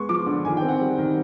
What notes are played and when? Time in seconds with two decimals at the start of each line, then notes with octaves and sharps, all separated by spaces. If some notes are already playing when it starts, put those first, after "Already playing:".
Already playing: G#3 B3 C6 C#6
0.09 F3 D6
0.26 D3
0.45 D#3 G#5
0.57 G5
0.62 C4
0.68 F#5
0.80 G3
0.98 D#3